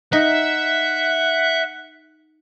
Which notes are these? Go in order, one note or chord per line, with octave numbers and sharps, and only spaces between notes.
D#4 E5 F#5